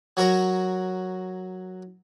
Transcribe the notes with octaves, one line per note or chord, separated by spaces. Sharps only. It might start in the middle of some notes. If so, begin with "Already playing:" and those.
F#3 F#4 A#4 C#5